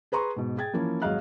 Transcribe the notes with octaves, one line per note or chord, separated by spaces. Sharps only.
G#4 B4 A#5 C6 C#6
G#2 B2
G#4 G5 G#6 A6
E3 F3 A#3 C#4 E4
G#1 F#3 G#3 D#5 F5 F#6